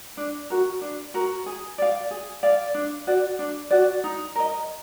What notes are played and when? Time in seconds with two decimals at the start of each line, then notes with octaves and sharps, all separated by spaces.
0.17 D4
0.50 F#4 A#4
0.81 D4
1.14 F#4 A#4
1.46 G#4
1.78 D5 F5
2.11 G#4
2.43 D5 F5
2.74 D4
3.07 F#4 D5
3.39 D4
3.71 F#4 D5
4.04 D#4
4.36 A#4 D#5